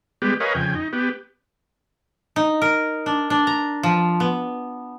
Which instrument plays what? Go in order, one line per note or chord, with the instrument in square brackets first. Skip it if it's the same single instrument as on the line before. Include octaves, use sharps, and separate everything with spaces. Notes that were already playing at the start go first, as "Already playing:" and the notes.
[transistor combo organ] G3 G#3 B3 G4
A#4 B4 C#5 D#5 F5 G#5
F2 C#3 G5 G#5
D#4
B3 G4
[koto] D#4
A#4
D4
D4
A#5
F3
B3